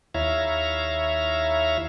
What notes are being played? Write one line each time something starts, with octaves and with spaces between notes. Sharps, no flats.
D#2 E4 C#5 E5 F5 A#5